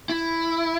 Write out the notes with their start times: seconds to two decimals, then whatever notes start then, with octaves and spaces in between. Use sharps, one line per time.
0.10 E4